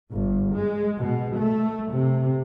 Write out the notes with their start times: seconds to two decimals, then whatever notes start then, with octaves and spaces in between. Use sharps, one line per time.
0.13 G1
0.55 G#3
0.99 B2
1.39 A3
1.91 C3